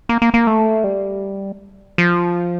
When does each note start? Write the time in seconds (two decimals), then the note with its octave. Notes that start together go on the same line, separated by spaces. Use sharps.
0.09 A#3
0.22 A#3
0.34 A#3
0.47 A3
0.84 G3
1.98 F3